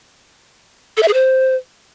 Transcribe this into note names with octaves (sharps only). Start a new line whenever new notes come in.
A4
E5
G#4
C5